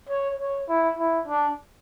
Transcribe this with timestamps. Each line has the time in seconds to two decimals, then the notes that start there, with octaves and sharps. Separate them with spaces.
0.09 C#5
0.40 C#5
0.69 E4
0.99 E4
1.28 D4